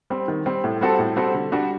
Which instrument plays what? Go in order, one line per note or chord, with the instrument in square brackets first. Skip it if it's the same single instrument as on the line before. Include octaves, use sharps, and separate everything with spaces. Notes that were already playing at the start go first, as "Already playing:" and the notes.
[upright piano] G3 C4
D#3
G3 C4
A2
G3 C4 F#4 A4
A2
G3 C4 F#4 A4
D3
G3 D4 F#4